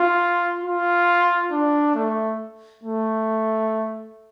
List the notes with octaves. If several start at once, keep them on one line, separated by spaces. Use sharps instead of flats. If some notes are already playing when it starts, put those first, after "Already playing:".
Already playing: F4
F4
D4
A3
A3